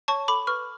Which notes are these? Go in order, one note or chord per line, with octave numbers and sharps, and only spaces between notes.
C#5 A5 C#6
A4 B5 D6
B4 C#6 F6